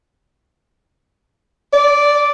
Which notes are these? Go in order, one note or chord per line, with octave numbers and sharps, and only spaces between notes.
D5